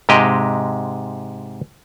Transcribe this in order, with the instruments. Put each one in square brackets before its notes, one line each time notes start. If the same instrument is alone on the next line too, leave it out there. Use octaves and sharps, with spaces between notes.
[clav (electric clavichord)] G#2 C3 G#3 G4 D#5